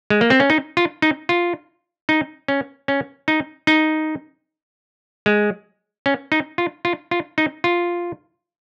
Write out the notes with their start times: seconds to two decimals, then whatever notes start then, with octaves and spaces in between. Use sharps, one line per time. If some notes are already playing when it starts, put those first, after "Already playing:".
0.10 G#3
0.21 A#3
0.30 C4
0.40 C#4
0.50 D#4
0.77 F4
1.02 D#4
1.29 F4
2.09 D#4
2.48 C#4
2.88 C#4
3.28 D#4
3.67 D#4
5.26 G#3
6.06 C#4
6.32 D#4
6.58 F4
6.85 F4
7.11 F4
7.38 D#4
7.64 F4